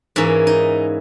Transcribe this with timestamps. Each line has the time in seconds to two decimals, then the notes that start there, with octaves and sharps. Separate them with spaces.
0.16 G#2 E3 A#3 C#4
0.47 D#4